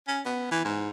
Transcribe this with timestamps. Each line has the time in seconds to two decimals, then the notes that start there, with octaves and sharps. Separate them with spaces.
0.07 C#4
0.25 B3
0.51 E3
0.64 G#2